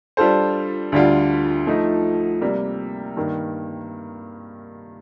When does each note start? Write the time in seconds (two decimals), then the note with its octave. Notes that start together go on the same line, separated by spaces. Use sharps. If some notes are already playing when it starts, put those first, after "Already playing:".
0.17 G3 D4 F4 A4 C5
0.92 D2 D3 G3 D4 F4
1.67 F3 A3 D#4
2.41 C3 G3 A#3
3.17 G2 D#3 A#3